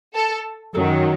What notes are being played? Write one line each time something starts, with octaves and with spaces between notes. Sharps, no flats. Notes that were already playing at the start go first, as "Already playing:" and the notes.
A4
F#2 D#3 F#3 A4